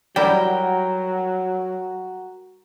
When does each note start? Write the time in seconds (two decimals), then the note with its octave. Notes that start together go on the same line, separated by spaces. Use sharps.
0.16 F#3 G3 E4 F#4 A#4 G5